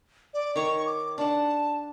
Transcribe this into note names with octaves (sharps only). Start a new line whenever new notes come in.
D5
D#3 C#5 C#6
D6
D4 F#5 A5